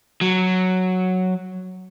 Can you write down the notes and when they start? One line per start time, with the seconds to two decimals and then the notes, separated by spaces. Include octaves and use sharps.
0.21 F#3